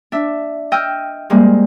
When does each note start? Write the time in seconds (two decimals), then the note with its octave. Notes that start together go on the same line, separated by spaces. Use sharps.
0.12 D4 E5
0.72 D#5 G5 E6 F6
1.30 G3 G#3 A#3 C4